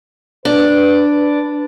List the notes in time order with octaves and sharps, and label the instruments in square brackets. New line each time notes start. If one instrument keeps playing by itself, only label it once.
[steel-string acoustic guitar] D4 [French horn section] B4